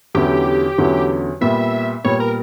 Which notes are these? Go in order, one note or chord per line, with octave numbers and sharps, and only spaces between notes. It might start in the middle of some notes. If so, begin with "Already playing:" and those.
E2 D3 F#3 C#4 E4 G4
E2 D3 F#3 C#4 E4
A#2 G3 B3 E5
A#2 G3 B3 C#5
A#4